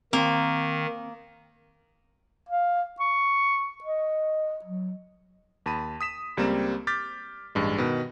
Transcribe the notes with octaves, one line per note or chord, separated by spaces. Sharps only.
D#3 A#3 C4 F5 C6
F5
C#6
D#5
F#3
D#2 A5 B5 D#7
D#6 B6 E7
C#2 G3 A#3 C4 A#5 E7
D6 F6 G6 A6 B6
A1 G2 G#3
B2 D#3 B4